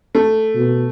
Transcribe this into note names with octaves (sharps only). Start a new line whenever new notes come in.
A3
B2